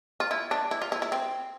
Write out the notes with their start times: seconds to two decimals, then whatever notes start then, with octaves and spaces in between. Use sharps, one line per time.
0.20 F4
0.31 E4
0.51 D4
0.71 E4
0.82 F4
0.92 E4
1.02 E4
1.12 C4